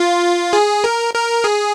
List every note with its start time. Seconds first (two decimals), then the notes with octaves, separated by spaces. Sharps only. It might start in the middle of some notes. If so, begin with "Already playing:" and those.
Already playing: F4
0.53 G#4
0.84 A#4
1.14 A#4
1.44 G#4